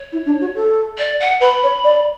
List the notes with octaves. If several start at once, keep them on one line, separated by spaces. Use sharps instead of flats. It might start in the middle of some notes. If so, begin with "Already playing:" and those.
Already playing: C#5
E4
D4
F#4
A4
D5
F#5
B4 B5
C#5
D5